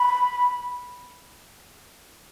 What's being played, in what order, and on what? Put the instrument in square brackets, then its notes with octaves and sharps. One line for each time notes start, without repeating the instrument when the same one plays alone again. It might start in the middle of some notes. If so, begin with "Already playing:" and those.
Already playing: [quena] B5